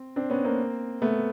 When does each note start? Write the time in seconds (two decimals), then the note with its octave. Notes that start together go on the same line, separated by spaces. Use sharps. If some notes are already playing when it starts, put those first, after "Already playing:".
Already playing: C4
0.16 C4 D4
0.30 B3 C#4
0.44 A#3 C4
1.02 A3 B3